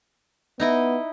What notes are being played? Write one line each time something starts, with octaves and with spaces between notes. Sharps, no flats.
B3 D#4 E4 D#5